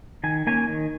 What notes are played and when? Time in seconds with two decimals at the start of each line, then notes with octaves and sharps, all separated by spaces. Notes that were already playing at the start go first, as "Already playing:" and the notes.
0.24 D#3 G#5
0.47 A#3 C#4 G#5
0.68 D#3